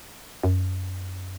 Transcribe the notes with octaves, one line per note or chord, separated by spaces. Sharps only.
F#2